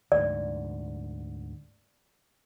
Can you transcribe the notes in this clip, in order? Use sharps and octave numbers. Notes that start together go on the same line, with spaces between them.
D2 G#2 D5